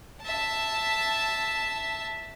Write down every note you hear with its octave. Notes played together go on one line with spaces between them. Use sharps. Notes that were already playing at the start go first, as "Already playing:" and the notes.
E5 A5